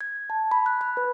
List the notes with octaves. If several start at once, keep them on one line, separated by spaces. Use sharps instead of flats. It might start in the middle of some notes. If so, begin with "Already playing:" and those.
G#6
A5
B5
F#6
B5
B4